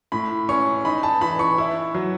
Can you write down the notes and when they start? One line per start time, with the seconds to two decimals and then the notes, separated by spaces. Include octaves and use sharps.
0.12 A2 B5
0.49 C#4 C#6
0.85 D#4 B5
1.03 A5
1.21 E3 B5
1.39 C#6
1.58 E4
1.94 F#3